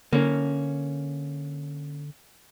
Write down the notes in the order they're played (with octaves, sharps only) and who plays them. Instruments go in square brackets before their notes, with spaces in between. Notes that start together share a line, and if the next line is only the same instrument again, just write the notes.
[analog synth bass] D3 [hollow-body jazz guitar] A#3 C#4